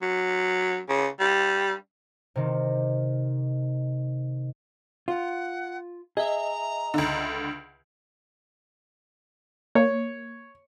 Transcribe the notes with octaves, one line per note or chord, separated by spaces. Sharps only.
F#3
C#3
G3
C3 D#3
F4 F#5
G#4 D#5 E5 A#5
C#2 D3
A#3 C#5